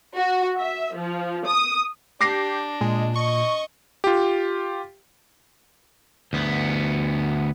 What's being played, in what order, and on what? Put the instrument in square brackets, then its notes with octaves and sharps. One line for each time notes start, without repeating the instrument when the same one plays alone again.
[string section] F#4
E5
F3
D#6
[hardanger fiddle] D4 [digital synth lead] G4 [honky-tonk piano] D6 A#6 C7
[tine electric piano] A#2 [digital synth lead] G#3
[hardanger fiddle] D#5 [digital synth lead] C#6
[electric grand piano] F4 G4
[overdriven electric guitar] D2 B3